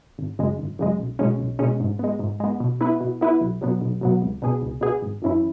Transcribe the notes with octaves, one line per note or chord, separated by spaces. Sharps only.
G#1
F#2 C#3 G#3
G#1
F#2 C#3 G#3
B1
B2 G#3 C#4
B1
B2 G#3 C#4
G#2
G#3 B3
G#2
G#3 B3
B2
B3 E4 B4
B2
B3 E4 B4
B1
B2 F#3 B3
B1
B2 F#3 B3
C#2
B2 B3 G#4
C#2
B2 B3 G#4
G#1
F#2 E3 C#4 E4